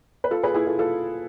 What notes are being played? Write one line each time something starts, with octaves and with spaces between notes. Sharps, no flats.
B4
F4 A4
G#4 B4
E4 G#4
F4 A4
F4 A4